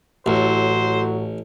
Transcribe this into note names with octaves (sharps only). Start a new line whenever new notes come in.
A1 A2 F#3 A4 C5